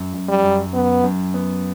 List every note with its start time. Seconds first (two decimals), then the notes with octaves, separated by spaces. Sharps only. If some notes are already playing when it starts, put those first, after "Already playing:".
Already playing: F#2
0.14 F#2
0.29 G3
0.43 F#2
0.74 F#2 B3
1.04 F#2
1.34 B3